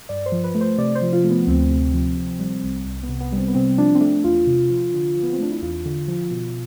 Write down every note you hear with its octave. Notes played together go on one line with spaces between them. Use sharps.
G2 D5
C5
F3
B4
A3
C5
C3 D5
C5
F3
F4
A3
B3
D2 C4
C3
F3
C3
G3
C2
C2
B3
C3
B3
G3
C4
B3
C3 C4
F3 D4
C4
A3 D4
E2 F4
C3
F3
D3
F3
B3
C4
A3 D4
E4
E2 F4
D3
F3
B2